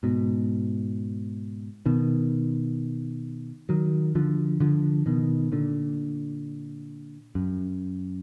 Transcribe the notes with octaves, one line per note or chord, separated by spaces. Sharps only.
G#2 B2
B2 D#3
D#3 F#3
D3 F3
D3 F3
B2 D#3
A#2 D3
F#2